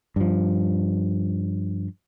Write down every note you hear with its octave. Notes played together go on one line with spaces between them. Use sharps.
G2 F3